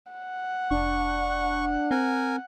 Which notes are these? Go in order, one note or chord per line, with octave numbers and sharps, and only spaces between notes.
F#5
F1 D4 C#6
C4 A#4 G#5